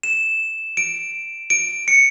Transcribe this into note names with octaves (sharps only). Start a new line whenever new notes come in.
E7
D7
D7
C#7